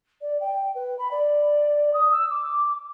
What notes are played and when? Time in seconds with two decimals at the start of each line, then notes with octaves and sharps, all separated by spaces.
0.21 D5
0.40 G5
0.75 B4
0.98 B5
1.11 D5
1.93 D#6
2.11 E6
2.30 D6